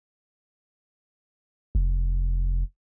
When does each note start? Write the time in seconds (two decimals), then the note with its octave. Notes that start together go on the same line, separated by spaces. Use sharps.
1.75 F1